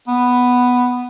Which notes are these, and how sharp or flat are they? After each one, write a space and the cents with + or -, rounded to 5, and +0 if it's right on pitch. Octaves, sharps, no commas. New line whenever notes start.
B3 +0